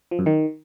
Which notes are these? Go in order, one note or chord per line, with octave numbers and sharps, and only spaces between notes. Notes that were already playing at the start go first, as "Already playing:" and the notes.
F3
F#2
D#3